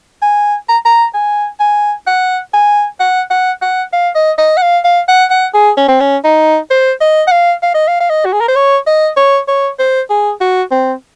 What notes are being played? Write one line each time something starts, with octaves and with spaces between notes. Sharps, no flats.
G#5
A#5
A#5
G#5
G#5
F#5
G#5
F#5
F#5
F#5
F5
D#5
D#5
F#5
F5
F5
F#5
F#5
G#4
C#4
C4
C#4
D#4
C5
D#5
F#5
F5
F5
D#5
F5
F5
D#5
F#4
G#4
A#4
C5
C#5
D#5
C#5
C#5
C5
G#4
F#4
C4